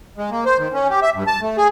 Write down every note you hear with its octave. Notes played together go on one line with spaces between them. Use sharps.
G#3
A#3
C5
D#3
C#4
G4
E5
G2
A5
A3
G#4